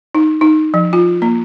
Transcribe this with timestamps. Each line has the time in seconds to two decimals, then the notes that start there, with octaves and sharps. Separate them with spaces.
0.15 D#4
0.41 D#4
0.74 F3
0.93 F4
1.22 A#3